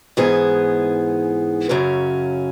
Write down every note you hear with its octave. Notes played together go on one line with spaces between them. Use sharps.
G#2 E3 B3 G#4
F#2 C#3 F#3 C#4